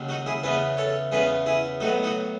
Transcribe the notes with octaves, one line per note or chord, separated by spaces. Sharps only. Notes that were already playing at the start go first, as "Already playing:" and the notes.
Already playing: D#2 C#3 F#3
D#4 F#4
E4 G#4
E2 C#3 E3 B3 G#4 B4
A4 C#5
E2 C#3 E3 B3 G#4 B4
E4 G#4
A2 F#3 B3 D#4 F#4
D#4 F#4